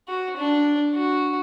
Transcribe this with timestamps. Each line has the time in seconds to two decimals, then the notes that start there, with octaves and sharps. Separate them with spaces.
0.08 F#4
0.37 D4
0.95 F#4